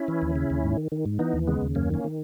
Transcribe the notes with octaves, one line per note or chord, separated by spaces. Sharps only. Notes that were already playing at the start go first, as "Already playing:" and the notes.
Already playing: C#4 E4
E3
D#2
C#3
D#2
G#2
D#3
D#3
G#2
E3 B3 D#4
D#2
C#3 G#3 B3
D#2
F#2 A#3 C#4
D#3 A#3 C#4
D#3